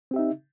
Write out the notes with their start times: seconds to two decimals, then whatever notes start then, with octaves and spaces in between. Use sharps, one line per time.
0.11 C4
0.14 G4
0.16 E5
0.19 D#4